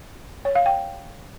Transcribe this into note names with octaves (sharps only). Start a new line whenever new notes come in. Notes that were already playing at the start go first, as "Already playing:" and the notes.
C#5
F5
G5